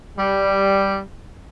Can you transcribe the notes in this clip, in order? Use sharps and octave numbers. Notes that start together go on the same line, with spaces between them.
G3